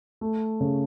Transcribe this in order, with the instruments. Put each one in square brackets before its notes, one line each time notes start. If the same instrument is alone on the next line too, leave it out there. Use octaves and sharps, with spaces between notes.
[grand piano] A3
C#3